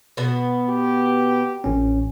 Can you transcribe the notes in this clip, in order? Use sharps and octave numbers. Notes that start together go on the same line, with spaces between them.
B2 B3
G4
A1 C#4